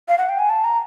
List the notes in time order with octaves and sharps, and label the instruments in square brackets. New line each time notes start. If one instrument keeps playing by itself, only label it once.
[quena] F5
F#5
G5
G#5
A5
A#5